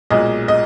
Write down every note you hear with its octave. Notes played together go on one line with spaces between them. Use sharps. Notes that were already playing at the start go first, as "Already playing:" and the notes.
B1 A#2 G#3 D#5
D#5